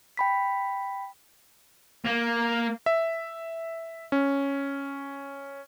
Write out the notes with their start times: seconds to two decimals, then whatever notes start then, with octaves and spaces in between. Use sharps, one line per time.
0.17 G5 B5 B6
2.05 A#3
2.86 E5
4.12 C#4